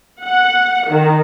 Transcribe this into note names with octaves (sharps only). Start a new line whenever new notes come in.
F#5
D#3